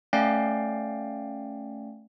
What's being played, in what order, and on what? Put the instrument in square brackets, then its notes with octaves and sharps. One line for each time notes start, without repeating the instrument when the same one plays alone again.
[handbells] A3 C#4 D5 F5 G5